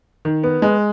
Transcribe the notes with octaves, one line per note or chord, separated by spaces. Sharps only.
D#3
B3
G#3